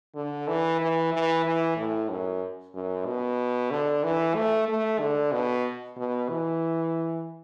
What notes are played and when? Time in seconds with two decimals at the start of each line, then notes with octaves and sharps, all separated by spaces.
0.15 D3
0.48 E3
0.81 E3
1.13 E3
1.45 E3
1.77 A2
2.10 F#2
2.75 F#2
3.06 B2
3.71 D3
4.04 E3
4.35 A3
4.68 A3
5.00 D3
5.32 B2
5.97 B2
6.29 E3